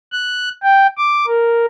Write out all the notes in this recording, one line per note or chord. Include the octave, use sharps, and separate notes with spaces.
F#6
G5
D6
A#4